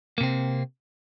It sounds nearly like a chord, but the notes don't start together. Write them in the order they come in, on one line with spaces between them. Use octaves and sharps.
A#3 C3 C4